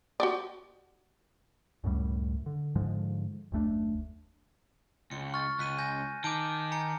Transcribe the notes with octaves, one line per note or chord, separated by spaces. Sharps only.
F#4 G4 D5
C#2 F#2 A2 G3
D3
G#2 D3 F3 G#3
F#1 D#2 A3 D4
C#2 C#7
C#6 F6 A6
C#2 F#6 B6 D#7
G#5 G6 A#6
D#3 A5 D6 G6 D7
G#5 A#5 C#7